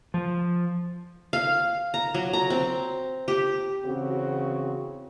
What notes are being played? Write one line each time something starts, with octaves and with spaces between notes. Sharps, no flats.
F3
F5
A#5
F#3
A#5
C4
G4
E2 C#3 C4 F#4